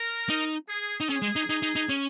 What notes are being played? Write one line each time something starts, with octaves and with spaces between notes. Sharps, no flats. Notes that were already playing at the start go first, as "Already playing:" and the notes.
Already playing: A#4
D#4
G#4
D#4
C#4 G#4
G#3
D#4
D#4
D#4
D#4
C#4